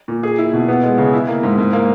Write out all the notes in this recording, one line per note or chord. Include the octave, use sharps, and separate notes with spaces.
A#2
G#4
E4
B2
B3
G#3
C#3
E4
A#3
G#2
G#2
A#3